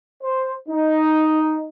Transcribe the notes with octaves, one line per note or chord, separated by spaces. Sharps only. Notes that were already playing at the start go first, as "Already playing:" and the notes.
C5
D#4